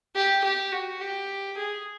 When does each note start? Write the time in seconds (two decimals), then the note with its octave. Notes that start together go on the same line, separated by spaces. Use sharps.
0.16 G4
0.44 G4
0.72 F#4
1.01 G4
1.57 G#4